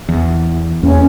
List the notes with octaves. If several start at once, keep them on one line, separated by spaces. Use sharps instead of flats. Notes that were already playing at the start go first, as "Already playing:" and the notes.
E2
E2 A#3 C#4